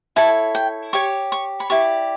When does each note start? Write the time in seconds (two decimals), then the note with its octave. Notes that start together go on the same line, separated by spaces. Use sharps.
0.16 E4 A4 C#5 A5
0.55 G5
0.93 G4 C#5 C#6
1.32 C#6
1.60 B5
1.70 E4 G4 D5 C#6